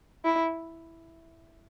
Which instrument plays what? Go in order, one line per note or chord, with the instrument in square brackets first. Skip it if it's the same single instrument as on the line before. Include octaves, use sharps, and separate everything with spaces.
[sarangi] E4